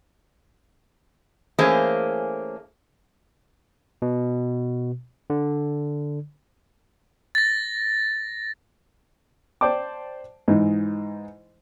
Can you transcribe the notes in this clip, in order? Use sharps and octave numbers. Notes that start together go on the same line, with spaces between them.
E3 A3 A#3 C#4 G#4 C5
B2
D3
A6 A#6
C5 D5 G5 A5 D6
G#2 E3 D#4